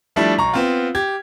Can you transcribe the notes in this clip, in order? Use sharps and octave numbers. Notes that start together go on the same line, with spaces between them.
F3 G3 A3 D4 E4
B1 A#5 C#6
B3 C4 F4
G4 G#6